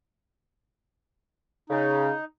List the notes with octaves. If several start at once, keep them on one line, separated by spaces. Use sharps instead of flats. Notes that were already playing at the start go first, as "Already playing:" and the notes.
C#3 D#4